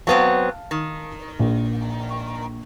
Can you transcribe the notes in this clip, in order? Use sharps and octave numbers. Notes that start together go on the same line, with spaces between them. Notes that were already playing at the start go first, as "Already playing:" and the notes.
F#3 B3 C4 F5 A5
D#3
A#1